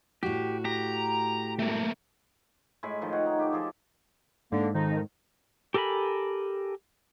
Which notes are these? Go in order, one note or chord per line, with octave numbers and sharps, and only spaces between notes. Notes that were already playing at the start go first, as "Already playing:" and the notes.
A2 F#4 G4
G4 A#5
A3 A#3
A2 G#3 G#5 B5
D#3 F3 C6
C#5 F#5 G5
D#4
G4 A4 D6
F3 G#4 A4
G#2 D3 A#3
F2 D#3 D#4
G4 A4 A#4 G#5 B5